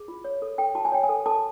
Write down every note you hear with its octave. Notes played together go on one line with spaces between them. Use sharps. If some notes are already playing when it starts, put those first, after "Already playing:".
Already playing: G#4
F4
C#5
A4
A4 G5
F#4 A5
G#5
C#5 G5
G#5
A4
A4 A5